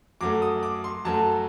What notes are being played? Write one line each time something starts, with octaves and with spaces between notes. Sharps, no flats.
F#2 F#3 A3 D6
D#6
D6
C6
F#2 F#3 A3 A5